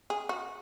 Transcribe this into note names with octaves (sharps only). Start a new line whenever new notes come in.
G#4
F#4